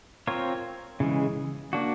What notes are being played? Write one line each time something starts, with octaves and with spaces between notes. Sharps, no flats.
C4 F4 A#4 C#5
C#3 E3 G#3
A#3 D4 F#4